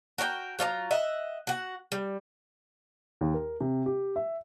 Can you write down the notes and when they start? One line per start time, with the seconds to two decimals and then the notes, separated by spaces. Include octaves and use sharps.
0.18 F#4 A#4 D5 G5
0.59 F#3 F4 D5 A#5
0.91 D#5 E5 F#5
1.47 F#4 F#5
1.92 G3
3.21 D#2
3.34 A#4
3.61 C3
3.86 G4
4.16 E5